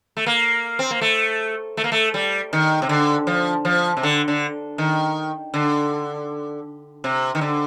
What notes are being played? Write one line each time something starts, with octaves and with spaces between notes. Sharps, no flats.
A3
A#3
C4
A#3
A3
A3
A#3
A3
G3
D#3
C3
D3
F3
F3
C3
D3
D3
D#3
D3
C3
D#3
D3